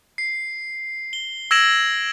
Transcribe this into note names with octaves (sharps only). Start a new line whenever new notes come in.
C7
G7
E6 G#6 A#6 D7 E7 F#7